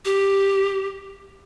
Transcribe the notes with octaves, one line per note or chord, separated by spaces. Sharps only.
G4